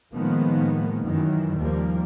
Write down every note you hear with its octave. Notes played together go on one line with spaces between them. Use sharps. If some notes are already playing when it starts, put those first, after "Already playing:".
A2 D#3 F3 G#3 A#3 B3
F#2 D#3 E3 F#3
D#2 F3 G3 A#3